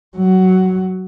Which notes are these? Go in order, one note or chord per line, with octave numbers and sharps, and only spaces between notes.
F#3